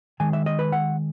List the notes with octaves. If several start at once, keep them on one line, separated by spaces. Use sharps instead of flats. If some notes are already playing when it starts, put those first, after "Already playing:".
D#3 G#3 G#5
E5
D#5
B4
F#5